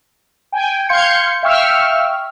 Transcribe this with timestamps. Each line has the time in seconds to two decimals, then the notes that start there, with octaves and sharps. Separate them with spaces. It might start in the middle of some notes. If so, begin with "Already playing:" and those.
0.52 G5 G#5
0.89 F5 C6 G6 G#6 C#7
1.43 E5 F5 G5 C#6 E6 F6